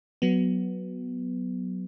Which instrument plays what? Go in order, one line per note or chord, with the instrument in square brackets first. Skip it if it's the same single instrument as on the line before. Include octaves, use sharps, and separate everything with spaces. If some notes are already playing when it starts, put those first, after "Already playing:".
[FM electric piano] F#3 B3